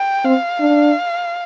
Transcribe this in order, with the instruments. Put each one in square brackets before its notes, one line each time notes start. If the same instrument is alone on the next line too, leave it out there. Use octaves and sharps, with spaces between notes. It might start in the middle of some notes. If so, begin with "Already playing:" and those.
Already playing: [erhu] G5
[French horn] C4 [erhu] F5
[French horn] D4